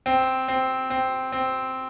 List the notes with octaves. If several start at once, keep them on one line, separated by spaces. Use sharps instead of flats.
C4
C4
C4
C4